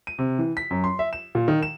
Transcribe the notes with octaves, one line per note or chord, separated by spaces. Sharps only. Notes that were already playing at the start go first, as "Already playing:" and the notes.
D#7
C3
E3
B6
F#2
C6
E5
E7
A#2
D#3
E7